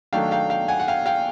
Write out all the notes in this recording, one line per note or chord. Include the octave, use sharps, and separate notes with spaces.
D#3 F#3 A3 D4 F5 G5
F5 G5
F5 G5
F#5 G#5
F#5
F5 G5
F5 G5